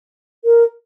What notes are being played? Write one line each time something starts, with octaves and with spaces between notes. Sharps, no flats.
A#4